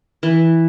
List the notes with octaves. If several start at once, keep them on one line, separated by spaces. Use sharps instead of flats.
E3